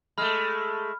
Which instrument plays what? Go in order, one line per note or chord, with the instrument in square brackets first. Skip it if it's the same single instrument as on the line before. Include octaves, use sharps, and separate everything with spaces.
[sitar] G#3 A3 [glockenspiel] B5 F6